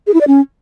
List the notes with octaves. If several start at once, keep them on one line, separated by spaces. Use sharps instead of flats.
G#4
E4
D5
C#4